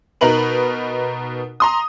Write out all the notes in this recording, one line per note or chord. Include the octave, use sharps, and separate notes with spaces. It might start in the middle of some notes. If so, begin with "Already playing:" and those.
B2 D#4 A#4 B4 F#7
A#5 C6 D#6